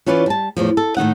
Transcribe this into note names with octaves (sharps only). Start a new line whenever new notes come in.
E3 C#4 F4 B4 C#5 D5
G3 A5
E2 A2 F3
A4
A2 D#3 D#4 F#5